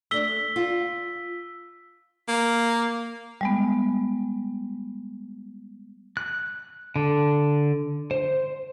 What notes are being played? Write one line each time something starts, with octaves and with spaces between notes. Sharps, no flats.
A3 D4 E6 B6 G7
F4
A#3
G3 G#3 B3
F#6
D3
C5